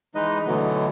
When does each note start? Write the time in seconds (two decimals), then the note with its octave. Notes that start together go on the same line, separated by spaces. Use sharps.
0.15 E3 G#3 D#4 B4 D#5
0.46 B2 D3 E3 F#3 A3 B3